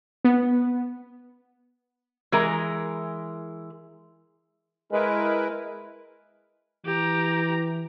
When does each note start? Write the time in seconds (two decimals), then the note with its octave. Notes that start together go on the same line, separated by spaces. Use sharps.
0.25 B3
2.32 E3 G#3 A#4
4.92 G#3 E4 A#4 B4
6.86 E3 G4 A#5